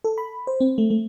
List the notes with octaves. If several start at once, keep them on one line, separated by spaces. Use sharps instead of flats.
A4
B5
C5
C4
A3
A3